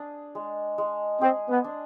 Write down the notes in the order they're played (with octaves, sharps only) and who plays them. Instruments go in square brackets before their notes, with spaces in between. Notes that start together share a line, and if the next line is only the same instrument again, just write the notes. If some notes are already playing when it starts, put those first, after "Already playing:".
Already playing: [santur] D4 G#4
G#3
G#3
[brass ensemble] C4 [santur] G#4
[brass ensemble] B3
[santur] D4